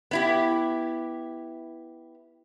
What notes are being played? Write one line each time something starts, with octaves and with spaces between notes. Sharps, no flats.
B3 E4 G4